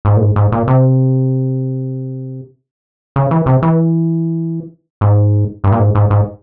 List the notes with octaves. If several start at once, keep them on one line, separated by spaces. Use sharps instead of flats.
G#2
A#2
G#2
G#2
A#2
C3
C#3
E3
C3
E3
G#2
G2
A#2
G#2
G#2
G#2